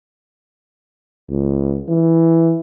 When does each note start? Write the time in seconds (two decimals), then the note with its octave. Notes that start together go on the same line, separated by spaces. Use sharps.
1.30 C#2
1.89 E3